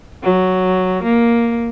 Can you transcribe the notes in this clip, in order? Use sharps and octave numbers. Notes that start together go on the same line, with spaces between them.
F#3
A#3